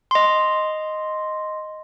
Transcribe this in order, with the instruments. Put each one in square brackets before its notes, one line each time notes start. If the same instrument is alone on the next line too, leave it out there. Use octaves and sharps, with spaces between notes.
[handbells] D#5 C6